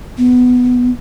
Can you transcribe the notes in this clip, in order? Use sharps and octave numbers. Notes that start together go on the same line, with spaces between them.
B3